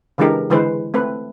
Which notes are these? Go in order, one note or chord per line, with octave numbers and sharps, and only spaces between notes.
C#3 E3 G#3 D4 G4 A#4
D3 E3 G#3 B4 C5
A3 C4 B4